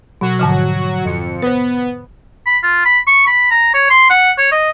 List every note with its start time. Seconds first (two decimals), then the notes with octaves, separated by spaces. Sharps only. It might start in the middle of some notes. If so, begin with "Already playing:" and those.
0.21 B2 F#3 F#4
0.39 G#2 D3 F3
1.04 F2 C#7
1.42 B3 B4 C5
2.46 B5
2.63 F4
2.85 B5
3.07 C#6
3.27 B5
3.51 A#5
3.74 C#5
3.90 C6
4.10 F#5
4.38 C#5
4.51 D#5